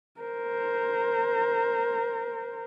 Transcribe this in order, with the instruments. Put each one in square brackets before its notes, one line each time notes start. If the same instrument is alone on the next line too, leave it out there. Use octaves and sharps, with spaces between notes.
[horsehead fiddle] A#4 C5